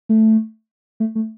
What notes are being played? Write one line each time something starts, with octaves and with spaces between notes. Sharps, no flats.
A3
A3
A3